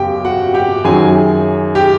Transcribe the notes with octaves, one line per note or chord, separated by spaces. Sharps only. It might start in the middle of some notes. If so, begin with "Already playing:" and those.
Already playing: F#2 C#3 F#3 B3 G4 G5
F#4 F#5
G4 G5
F#2 D#3 F#3 G#4 G#5
G4 G5